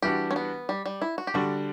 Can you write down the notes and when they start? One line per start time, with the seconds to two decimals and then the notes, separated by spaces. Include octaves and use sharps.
0.02 E3 G3 D4 F#4 G4
0.31 C#4
0.36 B3
0.69 G3
0.86 G3
1.02 E4
1.18 F#4
1.27 G4
1.34 D3 G3 D4 F#4